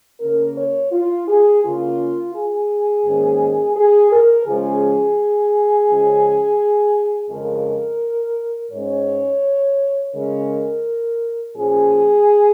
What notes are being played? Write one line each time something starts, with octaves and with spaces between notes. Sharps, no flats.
C#3 A#3 C#4 A#4
C#5
F4
G#4
C#3 A#3 C#4 F4
G#4
G#2 D#3 A#3 C#4
G#4
A#4
C#3 F3 G#3 C#4 G#4
C#3 F3 G#3 C#4
F2 C#3 G#3 A#4
G#2 G#3 C#4 C#5
C#3 G#3 C#4 A#4
A#2 F3 C#4 G#4